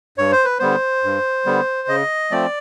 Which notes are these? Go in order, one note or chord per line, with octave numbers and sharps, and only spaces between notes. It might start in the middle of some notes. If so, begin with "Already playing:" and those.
G2 C#5
C5
B4
D3 G3 B3 C5
G2
D3 G3 B3
C#3 D#5
F3 A3 C4 D5